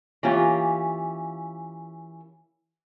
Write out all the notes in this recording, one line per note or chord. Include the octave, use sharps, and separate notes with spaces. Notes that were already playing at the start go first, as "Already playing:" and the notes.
E3 A#3 C#4 F4 G4